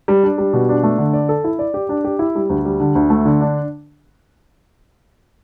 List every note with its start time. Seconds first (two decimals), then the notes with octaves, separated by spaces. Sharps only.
0.08 G3
0.23 D4
0.38 G3
0.53 B2
0.69 D4
0.83 A3
0.98 D3
1.13 D5
1.29 A4
1.44 E4
1.59 D5
1.74 G4
1.89 D4
2.04 G4
2.19 E4
2.35 G3
2.50 D2
2.65 G3
2.80 D3
2.95 D2
3.10 A3
3.25 D3
3.41 D4